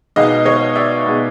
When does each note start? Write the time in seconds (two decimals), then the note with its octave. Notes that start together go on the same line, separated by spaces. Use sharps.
0.16 B2 G#3 B3 D#4 D#5 F5
0.46 C#5 D#5
0.75 D5 E5
1.04 B2 G#3 B3 D#4